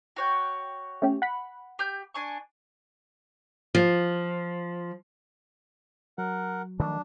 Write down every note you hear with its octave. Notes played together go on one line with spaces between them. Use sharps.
F#4 C#5 G5
A3 C#4 G4
F#5 B5
G4 G6
D4 G#5 C#6
F3
F#3 A#4 F#5
D#3 F3 A3 D4